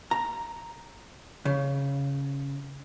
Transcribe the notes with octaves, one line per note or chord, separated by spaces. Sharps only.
A#5
C#3